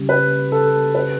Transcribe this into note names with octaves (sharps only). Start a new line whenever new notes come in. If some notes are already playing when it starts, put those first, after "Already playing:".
Already playing: C#3 G3 C#4 G4
B4
A4
B4